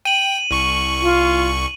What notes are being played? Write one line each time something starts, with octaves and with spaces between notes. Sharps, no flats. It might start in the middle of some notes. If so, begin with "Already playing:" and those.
G5 D#7 F#7
C2 C#6 C#7
F4